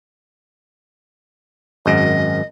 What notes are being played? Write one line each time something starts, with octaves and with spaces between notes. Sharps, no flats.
G#1 F#2 D#5